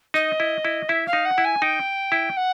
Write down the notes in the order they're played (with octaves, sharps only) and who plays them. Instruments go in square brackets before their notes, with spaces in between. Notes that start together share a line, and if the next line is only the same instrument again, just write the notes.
[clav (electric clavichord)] D#4 [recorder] D#5
[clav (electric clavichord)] E4
E4
[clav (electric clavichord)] E4 [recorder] E5
[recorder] F5
[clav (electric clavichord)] D#4
[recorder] F#5
[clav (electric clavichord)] E4
[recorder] G#5
[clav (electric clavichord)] D#4 [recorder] G5
[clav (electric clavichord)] E4
[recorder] F#5